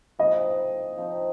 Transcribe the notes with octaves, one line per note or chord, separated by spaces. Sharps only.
F3 C4 D#4 D#5
F3 C4 D#4